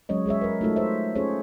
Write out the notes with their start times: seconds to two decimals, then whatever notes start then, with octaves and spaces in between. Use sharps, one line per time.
0.09 F#3 G#3 C#4 C#5 D#5
0.26 G#3 G#4 C#5 E5
0.41 A#4 B4
0.61 A3 D#4 F4 F#4 A4
0.76 C5 C#5 E5
1.15 C#4 F4 G#4 A4 C5 C#5